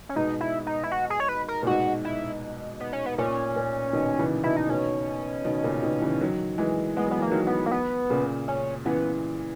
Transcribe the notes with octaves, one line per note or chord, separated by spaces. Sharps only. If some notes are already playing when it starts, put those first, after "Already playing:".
C#4
G#2 B2 D#4
E4
D#4
E4
F#4
G#4
C#5
B4
A#4
A#2
G#2 B2 F#4
E4
B3
C#4
B3
A#2 C#4
A#2
B2 D#3
C#3 E3
B2 D#3 E4
D#4
B2 D#3 C#4
B2 D#3
A#2 C#3
B2 D#3
C#3 E3
D#3 F#3
E3 G#3
G#3 B3
F#3 B3
E3 A#3
D#3 F#3
B3
A#3
B3
A#2 C#3
C#4
C#3 E3 B3